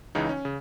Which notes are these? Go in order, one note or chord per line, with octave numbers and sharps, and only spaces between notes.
C#2 C#3 E3 D#4
C#4
C#3